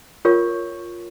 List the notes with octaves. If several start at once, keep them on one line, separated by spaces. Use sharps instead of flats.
F4 A#4 C#5 C#6